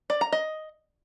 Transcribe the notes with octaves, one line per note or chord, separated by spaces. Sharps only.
D5
A#5
D#5